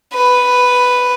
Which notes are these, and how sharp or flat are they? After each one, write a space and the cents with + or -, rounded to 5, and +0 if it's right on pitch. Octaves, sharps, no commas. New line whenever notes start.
B4 +5